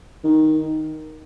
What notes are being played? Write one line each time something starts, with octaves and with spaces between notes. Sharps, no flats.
D#3